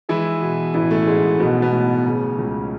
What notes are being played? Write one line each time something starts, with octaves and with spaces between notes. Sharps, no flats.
E3 G#3 E4
B2
A1 E3 E4
A3
G#2 G#3
B1 B2 B3
B2 B3
A2
C#3
C#2